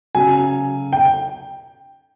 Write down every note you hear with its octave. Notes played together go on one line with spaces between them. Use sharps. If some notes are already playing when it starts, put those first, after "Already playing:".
C#3 F#3 G#5
G5